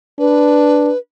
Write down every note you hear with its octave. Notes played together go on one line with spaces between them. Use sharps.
D4 B4